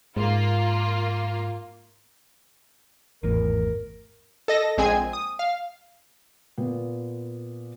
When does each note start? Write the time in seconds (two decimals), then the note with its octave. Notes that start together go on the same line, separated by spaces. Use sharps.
0.17 G#2 A#3 F4
3.23 G#1 E2 A2 A#4
4.48 A4 D#5 A#6
4.78 A#1 G#3 C4 G#4 G#5 G#6
5.13 D#6
5.39 F5
6.58 A#2 B3